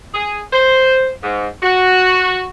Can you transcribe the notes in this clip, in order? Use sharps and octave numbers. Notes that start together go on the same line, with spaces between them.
G#4
C5
G#2
F#4